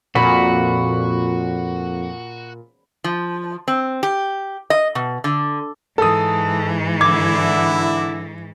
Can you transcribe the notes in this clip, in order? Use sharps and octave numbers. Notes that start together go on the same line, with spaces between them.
F2 A#2 F#4 B5
F3
C4
G4
D#5
B2
D3
G#2 E3 A4 D#6
D3 E4 D6 G#6